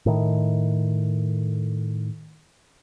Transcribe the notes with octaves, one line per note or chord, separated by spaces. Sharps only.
A2 D#3